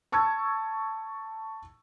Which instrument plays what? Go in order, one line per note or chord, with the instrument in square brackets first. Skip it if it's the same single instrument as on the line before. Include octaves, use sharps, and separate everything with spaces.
[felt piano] A5 C#6 E6 G#6